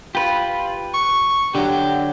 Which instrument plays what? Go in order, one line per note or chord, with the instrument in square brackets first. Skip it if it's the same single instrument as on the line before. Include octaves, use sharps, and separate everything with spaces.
[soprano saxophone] F4 [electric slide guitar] G4 B4
[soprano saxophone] C#6
[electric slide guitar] D3 F#3 [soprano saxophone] G4